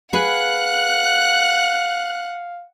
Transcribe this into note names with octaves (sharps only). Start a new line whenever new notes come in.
G#4 B4 F5 F#5 F#6